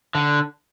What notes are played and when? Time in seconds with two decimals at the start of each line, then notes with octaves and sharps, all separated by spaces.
0.15 D3